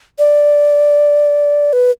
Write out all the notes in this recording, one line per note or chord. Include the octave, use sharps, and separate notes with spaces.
D5
B4